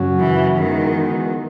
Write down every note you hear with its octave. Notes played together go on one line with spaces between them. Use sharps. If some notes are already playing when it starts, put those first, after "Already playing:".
Already playing: F#2 C#3 F#3 C#4 F#4
E3
D#3 E3 G#3 B3 F#4